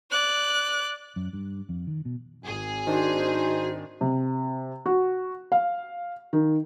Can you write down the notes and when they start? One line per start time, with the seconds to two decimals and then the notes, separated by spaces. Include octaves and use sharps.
0.11 D5 F#6
1.16 F#2
1.33 G2
1.69 F2
1.87 D#3
2.05 B2
2.45 G#1 G#4
2.87 D#3 D4 D#4 F#4 C5
4.01 C3
4.86 F#4
5.52 F5
6.33 D#3